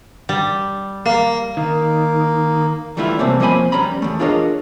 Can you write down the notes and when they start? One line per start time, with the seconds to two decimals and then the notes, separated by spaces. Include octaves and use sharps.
0.29 G3
1.06 A#3
1.57 D#3 A#3
2.97 E3 G3 A3 E4 F4
3.19 C3 G3 A3 A#3 C4 C#4
3.40 F3 A#3 C4 D#5 G#5 B5
3.72 E2 G3 C#4 A#5 B5
4.02 E2 A3
4.20 D4 F4 G#4 A#4 C#5 D#5